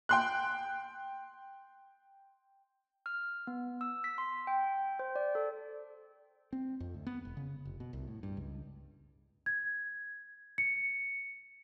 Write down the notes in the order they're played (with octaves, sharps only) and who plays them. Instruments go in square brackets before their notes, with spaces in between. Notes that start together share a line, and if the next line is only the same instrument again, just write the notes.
[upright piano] G5 C6 F#6
[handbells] F6
B3
E6
B6
C6
G5
C5
D5
A4
[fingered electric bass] C4
F2
D2
B3
E1
C#3
F1
B2
C2
A2
G2
C#2
[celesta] G#6
C#7